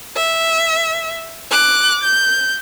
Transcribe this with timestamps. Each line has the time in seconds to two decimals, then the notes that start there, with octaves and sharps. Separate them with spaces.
0.16 E5
1.52 D6 F#6
2.04 G6